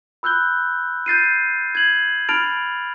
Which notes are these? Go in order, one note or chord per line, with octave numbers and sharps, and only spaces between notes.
B5 E6 F#6 G6 G7
G6 A6 C7 D#7
G#6 F#7
A5 B5 F6 A6 D7 F7